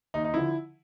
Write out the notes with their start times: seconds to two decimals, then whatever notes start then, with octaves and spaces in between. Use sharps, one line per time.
0.14 D#2 D#4
0.24 D#4
0.34 D3 F3 E4